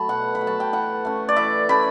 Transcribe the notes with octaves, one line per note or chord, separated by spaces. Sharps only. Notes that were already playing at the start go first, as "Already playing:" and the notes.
Already playing: F#3 A3 A5 B5
B2 F#5
B5
F#3 A3
A5
G5
E3 F#5
A3 C#4
D5
E3 E5
A3 C#4 B5